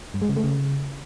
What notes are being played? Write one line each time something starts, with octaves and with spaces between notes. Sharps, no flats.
G2
G#3
C#3
A3
C#3